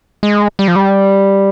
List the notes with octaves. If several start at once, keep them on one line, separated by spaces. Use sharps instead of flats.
G#3
G3
F3
G3